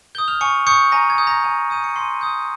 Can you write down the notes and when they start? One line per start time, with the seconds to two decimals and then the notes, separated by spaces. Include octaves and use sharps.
0.15 D#6 G6 G7
0.28 F6 F7
0.41 G#5 C#6 C#7
0.67 C#6 D#6 G6 C#7
0.92 G#5 A#5 A#6
1.10 G#6
1.18 D#6 G6
1.27 A#5 A#6
1.44 G#5
1.70 D#6 G6 D#7
1.84 C#7
1.96 G#5 C6 C7
2.21 D#6 G6